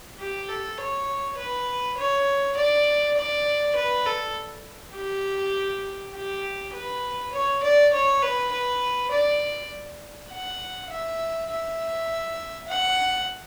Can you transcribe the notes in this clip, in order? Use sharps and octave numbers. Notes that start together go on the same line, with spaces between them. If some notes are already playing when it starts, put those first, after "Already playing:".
G4
A4
C#5
B4
C#5
D5
D5
B4
A4
G4
G4
B4
C#5
D5
C#5
B4
B4
D5
F#5
E5
E5
F#5